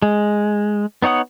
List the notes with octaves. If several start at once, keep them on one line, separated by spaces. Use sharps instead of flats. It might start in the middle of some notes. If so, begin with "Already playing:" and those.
G#3
B3 D#4 C#5 F#5 D#6